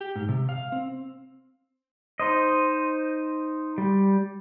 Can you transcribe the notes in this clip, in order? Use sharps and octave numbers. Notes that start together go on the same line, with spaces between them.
G4
G#2
C3
F5
C4
D#4 C5 D#5
G3